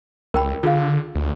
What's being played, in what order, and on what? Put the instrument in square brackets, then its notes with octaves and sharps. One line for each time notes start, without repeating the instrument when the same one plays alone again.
[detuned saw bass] C#2 [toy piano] A#4 G5 B5
[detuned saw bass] D3 [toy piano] F4 G#4 F5
[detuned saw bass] D2